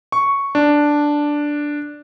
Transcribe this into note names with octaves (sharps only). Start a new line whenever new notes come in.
C#6
D4